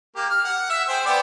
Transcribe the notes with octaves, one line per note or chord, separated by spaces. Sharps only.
A#3 G4
F6
F#5
E5
G#4 C5 G5
B3 D5 G5